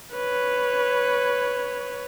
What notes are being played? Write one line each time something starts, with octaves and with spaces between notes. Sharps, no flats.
B4 C#5